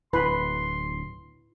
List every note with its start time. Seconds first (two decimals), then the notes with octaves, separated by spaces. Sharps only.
0.13 D1 E4 B4 C6